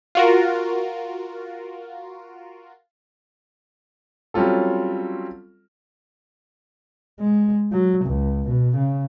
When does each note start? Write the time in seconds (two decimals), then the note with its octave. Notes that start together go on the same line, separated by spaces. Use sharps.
0.15 F4 F#4 A#4
4.34 F#3 G3 C4 C#4 F4 A4
7.20 G#3
7.72 F#3
8.05 C#2
8.47 B2
8.76 C#3